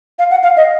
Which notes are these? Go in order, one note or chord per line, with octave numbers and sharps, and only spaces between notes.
F5
F#5
F5
D#5